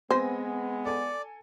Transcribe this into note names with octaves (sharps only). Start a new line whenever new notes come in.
G#3 B3 C4 C5 G#5 A#6
A4 D5 G#5